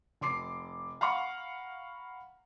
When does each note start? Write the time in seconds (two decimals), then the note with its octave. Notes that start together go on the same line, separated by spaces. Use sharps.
0.21 F1 C6 D6 C7
1.01 F5 F#5 A#5 B5 C#6